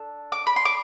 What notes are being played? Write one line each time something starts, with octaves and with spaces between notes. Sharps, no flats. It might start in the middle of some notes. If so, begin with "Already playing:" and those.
Already playing: D4 A4
D6
B5
C6
D6